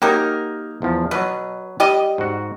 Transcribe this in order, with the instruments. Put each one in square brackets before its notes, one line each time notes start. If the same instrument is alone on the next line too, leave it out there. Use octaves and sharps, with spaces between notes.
[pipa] F#3 G4 A#4 [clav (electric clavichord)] A#3 D#4
[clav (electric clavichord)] E2 F3
[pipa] B2 [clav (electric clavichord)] F#3 B4
[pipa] G3 G4 D#5
[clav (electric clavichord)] G#2 F#4